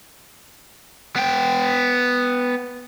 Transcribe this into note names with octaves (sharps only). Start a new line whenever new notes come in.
B3 G5